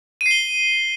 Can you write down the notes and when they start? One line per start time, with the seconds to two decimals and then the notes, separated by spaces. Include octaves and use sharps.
0.21 D#7
0.26 C7
0.31 G7